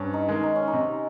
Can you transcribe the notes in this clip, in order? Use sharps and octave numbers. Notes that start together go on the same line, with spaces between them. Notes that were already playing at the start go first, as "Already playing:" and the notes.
Already playing: G2 C#4
D#4
D#3 G#3
D#4
C#4
D#4
C3